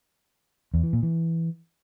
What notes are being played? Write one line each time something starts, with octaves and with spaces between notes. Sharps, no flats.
E2
E3
A#2
E3